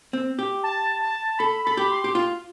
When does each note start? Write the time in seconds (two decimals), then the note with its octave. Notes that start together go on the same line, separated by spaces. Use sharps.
0.13 C4
0.39 G4
0.63 A5
1.02 A5
1.39 A4 B5
1.65 A4 B5
1.77 G4
1.91 C6
2.04 G4
2.15 F4